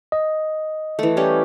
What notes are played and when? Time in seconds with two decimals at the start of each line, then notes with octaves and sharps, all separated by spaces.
0.12 D#5
0.99 E3 A3
1.17 G3 C#4 G4